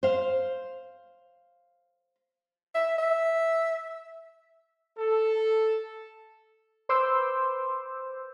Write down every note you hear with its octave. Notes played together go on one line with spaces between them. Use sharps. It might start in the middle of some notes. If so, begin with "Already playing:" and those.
C5 F5
E5
E5
A4
B4 C5 C6 D6 E6 G6